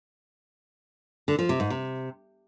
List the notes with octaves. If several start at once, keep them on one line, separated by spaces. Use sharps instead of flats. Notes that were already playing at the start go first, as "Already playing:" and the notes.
D3
F3
C3
G#2
C3